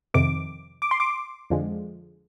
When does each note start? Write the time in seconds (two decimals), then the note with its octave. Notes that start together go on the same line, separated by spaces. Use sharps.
0.14 F2 C3 D#3 D6
0.82 D6
0.91 C6
1.00 D6
1.50 F2 D3 F3 G#3